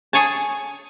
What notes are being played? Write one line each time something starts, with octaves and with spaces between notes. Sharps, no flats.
G#4 C#5 G#5 A5